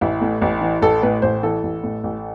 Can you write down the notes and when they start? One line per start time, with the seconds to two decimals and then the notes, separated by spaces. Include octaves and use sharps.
0.01 A1 E4
0.21 A2
0.41 A1
0.61 E3
0.82 A1 A4
1.02 A2 B4
1.22 A1 C5
1.43 E3 A4
1.63 A1
1.83 A2
2.03 A1